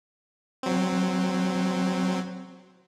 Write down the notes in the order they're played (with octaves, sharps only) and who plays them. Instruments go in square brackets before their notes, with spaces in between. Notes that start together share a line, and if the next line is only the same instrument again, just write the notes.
[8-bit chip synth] F#3 C4